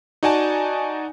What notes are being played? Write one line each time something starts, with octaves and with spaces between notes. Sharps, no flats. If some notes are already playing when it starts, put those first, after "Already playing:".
D#4 F#4 D5 G#5 A5